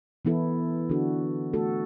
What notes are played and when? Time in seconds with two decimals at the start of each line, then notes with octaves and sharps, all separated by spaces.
0.25 E3 B3 E4 A4
0.89 D3 F#3 D4 F#4 A4
1.53 A3 F#4 A4